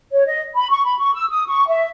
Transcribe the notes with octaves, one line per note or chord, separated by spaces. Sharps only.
C#5
D#5
B5
C#6
B5
C#6
E6
D#6
C#6
E5